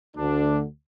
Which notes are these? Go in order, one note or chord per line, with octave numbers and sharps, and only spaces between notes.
D2 D3 D4